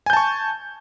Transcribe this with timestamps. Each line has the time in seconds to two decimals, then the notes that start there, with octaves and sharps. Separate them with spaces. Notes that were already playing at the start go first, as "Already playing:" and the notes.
0.06 G#5
0.10 G6
0.13 A5
0.17 C#6